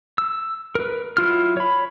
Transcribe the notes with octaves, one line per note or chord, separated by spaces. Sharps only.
E6
A#4 B4
F#3 E4 F4 F6
C#5 B5